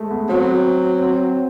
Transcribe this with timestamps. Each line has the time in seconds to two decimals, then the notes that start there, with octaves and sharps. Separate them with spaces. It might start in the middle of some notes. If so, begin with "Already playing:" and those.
Already playing: G#3 A3
0.11 B3
0.29 F#3 C4
0.99 C4